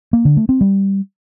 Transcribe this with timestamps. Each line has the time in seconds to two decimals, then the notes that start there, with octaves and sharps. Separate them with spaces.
0.13 A#3
0.25 D3
0.37 A3
0.49 C4
0.61 G3